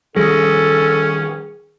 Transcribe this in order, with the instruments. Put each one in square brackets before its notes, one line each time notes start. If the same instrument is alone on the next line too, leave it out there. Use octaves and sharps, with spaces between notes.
[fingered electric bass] D#3 F3 G3 [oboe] C#4 [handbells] G#4 [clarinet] A4